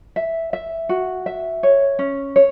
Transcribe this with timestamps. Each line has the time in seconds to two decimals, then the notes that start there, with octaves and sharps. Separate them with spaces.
0.16 E5
0.53 E5
0.89 F#4
1.26 E5
1.63 C#5
1.99 C#4
2.36 C#5